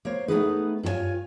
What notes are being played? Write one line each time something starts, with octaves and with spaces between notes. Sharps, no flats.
A#3 C5 C#5
A3 B3 C4 D#4 G#4 B4
G2 F4 F#4 C#5 G#5